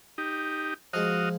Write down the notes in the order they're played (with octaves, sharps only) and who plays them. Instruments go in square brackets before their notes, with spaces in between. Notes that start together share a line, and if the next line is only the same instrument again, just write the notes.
[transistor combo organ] D#4 G4
[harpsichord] F3 G#3 [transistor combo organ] F#4 D#5 F5